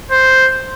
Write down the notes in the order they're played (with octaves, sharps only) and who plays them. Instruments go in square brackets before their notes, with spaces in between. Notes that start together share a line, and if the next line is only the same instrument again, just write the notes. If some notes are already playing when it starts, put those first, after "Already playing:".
[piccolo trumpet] C5